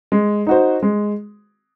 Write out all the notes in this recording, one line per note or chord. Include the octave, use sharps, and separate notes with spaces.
G#3
D#4 F#4 C5
G#3